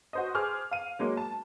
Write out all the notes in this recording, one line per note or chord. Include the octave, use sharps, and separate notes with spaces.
F#4 C5 D#5
G#4 C5 D6 F6
F5 D#7
F#3 G#3 A#3
A5